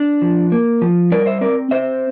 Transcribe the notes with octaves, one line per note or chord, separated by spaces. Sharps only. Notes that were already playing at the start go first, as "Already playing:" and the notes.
Already playing: D4
F3
A#3
F3
G3 A#4 D5
C5 E5
C4 A#4 D5
C4 C5 E5